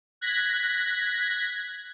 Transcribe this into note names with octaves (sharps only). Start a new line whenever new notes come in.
F#6 G#6 A#6 B6